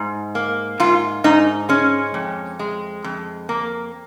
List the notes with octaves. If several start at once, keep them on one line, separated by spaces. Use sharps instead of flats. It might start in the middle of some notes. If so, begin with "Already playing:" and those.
Already playing: G#2
A#3
G#2 F4
G#2 D#4
G#3 C#4
F2
G#3
F2
A#3